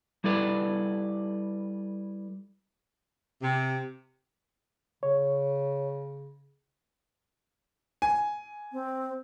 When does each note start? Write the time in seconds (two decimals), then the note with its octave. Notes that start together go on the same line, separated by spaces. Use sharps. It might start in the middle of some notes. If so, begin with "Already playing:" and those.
0.24 G3 E4 A4 B4 D5
3.43 C3
5.03 C#3 C#5
8.02 G#5
8.72 C4